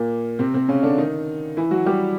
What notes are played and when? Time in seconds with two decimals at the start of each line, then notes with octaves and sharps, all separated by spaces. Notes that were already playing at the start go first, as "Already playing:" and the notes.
Already playing: A#2 A#3
0.39 C3 C4
0.54 C3 C4
0.68 C#3 C#4
0.83 D3 D4
0.98 D#3 D#4
1.57 E3 E4
1.71 F#3 F#4
1.86 G3 G4